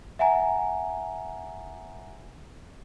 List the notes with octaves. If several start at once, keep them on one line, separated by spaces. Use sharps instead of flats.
E5 F#5 G#5 A#5